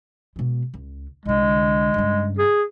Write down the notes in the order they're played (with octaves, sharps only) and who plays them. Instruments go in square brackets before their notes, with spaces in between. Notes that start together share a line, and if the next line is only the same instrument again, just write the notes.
[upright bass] B2 G#3
C#2
[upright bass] C2 D3 [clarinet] G#3
[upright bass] G2 C#3
[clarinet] G#4